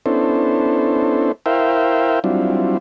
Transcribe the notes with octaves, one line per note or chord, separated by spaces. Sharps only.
B3 C#4 D4 E4 A4 C5
E4 A#4 C5 E5 F5 G5
F#3 G3 C4 D4 E4 F4